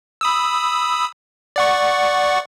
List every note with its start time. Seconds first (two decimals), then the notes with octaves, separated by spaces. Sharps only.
0.21 B5 D#6 E6
1.56 D5 F#5 C#6